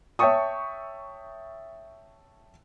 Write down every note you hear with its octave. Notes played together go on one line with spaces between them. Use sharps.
C#5 E5 G5 A5 C#6 D#6